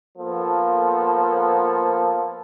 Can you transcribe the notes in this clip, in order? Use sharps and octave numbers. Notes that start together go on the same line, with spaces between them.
F3 A#3 B3 A4